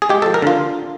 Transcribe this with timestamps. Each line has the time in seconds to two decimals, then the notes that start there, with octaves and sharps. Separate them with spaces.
0.02 G#4
0.09 G#3 G4
0.22 F3 A4
0.34 A#4
0.42 D3 F4